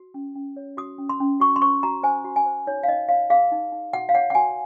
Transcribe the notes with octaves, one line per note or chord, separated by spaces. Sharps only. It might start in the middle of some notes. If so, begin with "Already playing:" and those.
Already playing: F#4
C#4
C#4
C#5
F#4 D#6
C#4
C6
C#4
F#4 C#6
C6
C5 C#6
F#4 A#5
C5 G#5
F#4
G#5
C5
D#4 C#5
F5
D#4 D#5
C#5 F5
G#4 F5
D#4
D#4
F#4 F#5
F5
C#5 F#5
F#5
F#4 G#5